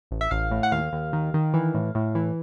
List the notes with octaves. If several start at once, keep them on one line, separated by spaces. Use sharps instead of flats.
A1
E5
A1 F5
A2
F#5
D#2 F5
D#2
D#3
D#3
E3
A2
A2
E3